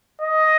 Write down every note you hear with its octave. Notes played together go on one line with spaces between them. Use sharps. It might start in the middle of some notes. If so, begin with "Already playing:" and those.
D#5